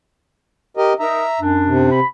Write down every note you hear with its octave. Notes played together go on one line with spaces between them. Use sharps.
G4 A#4 D#5
D#4 A#4 E5 A#5
F#2 D4
C3
B5